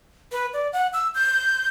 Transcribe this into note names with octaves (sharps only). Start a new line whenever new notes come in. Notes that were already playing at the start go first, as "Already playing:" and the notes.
B4
D5
F#5
E6
G6